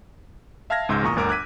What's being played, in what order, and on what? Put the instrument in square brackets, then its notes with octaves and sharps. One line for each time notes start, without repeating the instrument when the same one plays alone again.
[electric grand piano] E5 F5 A5 F6 G#6 A#6
C#2 G#2 C6 E6 G6
E2 A#2 A#5 C#6 D#6
G1 D2 A#4 A#5 D6 D7
D6 F#6 G#6 B6 D#7